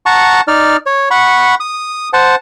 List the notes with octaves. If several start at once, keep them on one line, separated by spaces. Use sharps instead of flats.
F#5 A5 A#5 C#6
D#4 D5 F6
C#5
F#5 B5 C#6
D#6
C5 F#5 A5